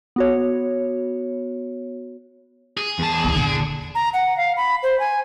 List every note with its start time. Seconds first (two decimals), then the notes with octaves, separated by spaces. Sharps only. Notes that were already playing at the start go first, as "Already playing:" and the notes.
0.16 B3 F#4 C#5
2.77 G#4
2.99 E2 A5
3.24 D#2 D#3
3.36 E2 A#2 D3
3.95 A#5
4.14 F#5
4.37 F5
4.57 B5
4.83 C5
5.00 G#5